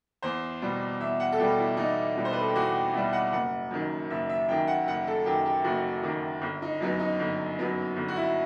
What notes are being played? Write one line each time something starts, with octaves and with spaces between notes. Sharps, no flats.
E2 C5
B2 G3
E2 E5
F#5
A4
B2 G3 G4
E4
E2 D#4
B2 G3
C5
B4
A4
G4
E2 F#4
G4
B2 G3 E5
F#5
F#1 F#5
F#2 D#3
F#1 E5
E5
F#2 D#3 G5
F#5
F#1 F#5
A4
F#2 D#3 G4
G4
F#1 F#4
F#2 D#3
G1
D#4
F#2 F#3 B3 D#4
D#4
G1
F#2 F#3 B3
G1
F#4
E4